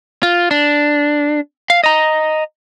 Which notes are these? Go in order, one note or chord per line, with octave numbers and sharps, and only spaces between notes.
F4
D4
F5
D#5 A#5